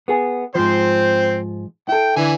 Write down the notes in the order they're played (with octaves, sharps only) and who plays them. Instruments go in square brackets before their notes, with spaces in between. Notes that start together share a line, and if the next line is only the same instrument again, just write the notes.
[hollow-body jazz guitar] B3 G#4 G#5
[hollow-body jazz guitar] G#2 F3 [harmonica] C4 C5
[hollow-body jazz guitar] E4 A4 [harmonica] G5
[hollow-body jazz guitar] D3 [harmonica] E3 G#5